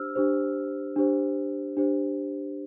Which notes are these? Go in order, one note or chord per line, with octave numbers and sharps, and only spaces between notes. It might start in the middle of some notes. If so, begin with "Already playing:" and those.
Already playing: D4 G4 C5 E6 F6
D4 G4 C5
D4 G4 C5
D4 G4 C5